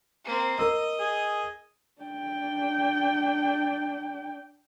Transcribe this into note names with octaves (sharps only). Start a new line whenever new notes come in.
A#3 C4
A#4 D#5 E6
G#4
D4 G5